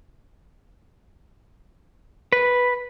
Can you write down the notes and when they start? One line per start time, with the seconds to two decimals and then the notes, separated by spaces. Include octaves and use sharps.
2.33 B4